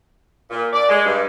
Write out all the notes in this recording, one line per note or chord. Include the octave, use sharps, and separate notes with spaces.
A#2
D5
G#3
G2